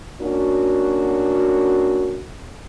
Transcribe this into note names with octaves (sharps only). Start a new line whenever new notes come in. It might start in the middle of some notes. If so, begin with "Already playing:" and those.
A#3 C#4 D4 F#4